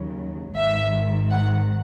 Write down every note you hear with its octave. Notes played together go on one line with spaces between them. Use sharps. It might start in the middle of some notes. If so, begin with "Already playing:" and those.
Already playing: D#2 C#3 F#3
G#1 G#2 D#3 E5
F#5